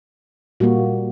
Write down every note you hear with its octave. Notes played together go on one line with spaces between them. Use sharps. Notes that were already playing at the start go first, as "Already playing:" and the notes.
A#2 G3 A#3 F#4